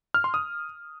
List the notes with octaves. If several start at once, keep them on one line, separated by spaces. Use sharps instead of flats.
F6
C6
D#6